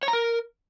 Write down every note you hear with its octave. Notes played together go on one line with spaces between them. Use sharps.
C#5
A#5
A#4